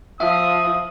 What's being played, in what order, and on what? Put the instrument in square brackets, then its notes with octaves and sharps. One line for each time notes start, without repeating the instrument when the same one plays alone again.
[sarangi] F3 [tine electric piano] E5 [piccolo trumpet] D#6